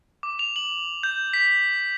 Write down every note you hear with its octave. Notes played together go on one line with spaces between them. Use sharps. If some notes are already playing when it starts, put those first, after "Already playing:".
D6
F7
F#7
G6
B6